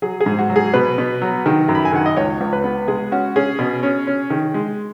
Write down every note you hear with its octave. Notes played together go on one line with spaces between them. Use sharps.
F#3 G#4
G#4
G#2
F#4
F#3
G#4
B2 B4
B2
F#3
D#3
F#2
B5
G#5
D#3 F#5
D#5
C#2 C#5
C#2
B4
B3
G#3 G#4
C#4 F#4
C#4 G#4
B2
C#4
C#4
D#3
G#3